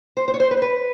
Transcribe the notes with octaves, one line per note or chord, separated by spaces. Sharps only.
C5
C5
C#5
C5
B4
C5
B4